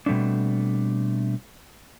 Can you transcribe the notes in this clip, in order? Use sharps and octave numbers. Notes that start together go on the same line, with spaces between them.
B2 G3 A3 C4 D4